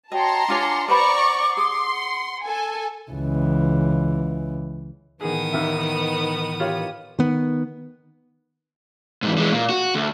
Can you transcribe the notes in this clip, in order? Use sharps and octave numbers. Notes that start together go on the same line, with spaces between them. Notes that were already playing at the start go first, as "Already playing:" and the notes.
F#4 C#5 D#5 G5 A5 A#5 C6
D4 F4 C#5 F#5 G#5 D6
B4 C5 D5 F#5 A#5 B5 C#6 D6
G#4 C6
F#5
A4 G#5
C#2 E3
A2 D#3 E3 B3 G#4 D#6
D#2 E5
F4 G4 C#5
D#3 B3
G#2 E3
E3 G#3
A#2
F#4
D2